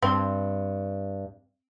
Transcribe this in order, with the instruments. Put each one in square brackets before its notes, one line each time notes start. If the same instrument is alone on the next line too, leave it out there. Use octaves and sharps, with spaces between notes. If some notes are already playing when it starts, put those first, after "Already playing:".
[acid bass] G2 [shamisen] C4